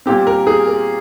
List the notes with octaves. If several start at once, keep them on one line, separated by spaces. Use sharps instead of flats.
A#2 G3 C4 G4
A#4
G#4
A#4